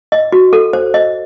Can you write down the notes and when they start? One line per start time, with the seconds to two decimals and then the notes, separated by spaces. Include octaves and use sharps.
0.12 D#5
0.32 F#4
0.53 A4
0.73 C5
0.94 D#5